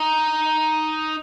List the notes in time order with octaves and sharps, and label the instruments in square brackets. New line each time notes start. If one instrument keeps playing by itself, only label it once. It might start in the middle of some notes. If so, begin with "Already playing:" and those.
Already playing: [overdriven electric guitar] D#4